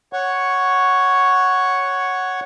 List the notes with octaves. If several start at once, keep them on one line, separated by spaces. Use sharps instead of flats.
C#5 F#5 C#6